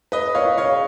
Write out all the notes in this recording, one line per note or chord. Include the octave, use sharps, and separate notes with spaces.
B4 D#5
A#2 C#5 F5
C#3 C#5 F5